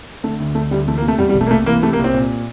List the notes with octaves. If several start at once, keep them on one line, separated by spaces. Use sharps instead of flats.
D3 A3
D2
D3 A3
D2 G3
E3 A3
A#3
C3
A3
E2 G3
G3
E1
A3
A#3
C2 A3
E3 A#3
C3 A3
A#3
C2
C4
A#2